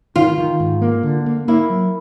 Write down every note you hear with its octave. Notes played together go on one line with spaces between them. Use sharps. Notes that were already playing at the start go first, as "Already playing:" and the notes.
D#3 F4
D#3
G#2
A#3
D3
A#3
A#3 E4
F#3